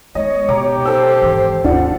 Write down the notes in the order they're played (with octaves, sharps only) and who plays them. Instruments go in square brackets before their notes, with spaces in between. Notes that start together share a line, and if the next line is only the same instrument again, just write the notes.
[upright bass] G#3 B3 [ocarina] C#5 [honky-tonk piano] D#5
[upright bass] B2 [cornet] G4 [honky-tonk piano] A#5 D6
[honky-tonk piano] A4 E6 [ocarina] C5
[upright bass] G#1 E3
[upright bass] F1 D#2 [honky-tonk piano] D4 F4 [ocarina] F#5